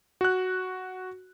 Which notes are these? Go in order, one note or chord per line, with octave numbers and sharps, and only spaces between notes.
F#4 F#6